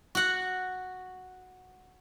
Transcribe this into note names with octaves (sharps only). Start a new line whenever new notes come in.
F#4 F#5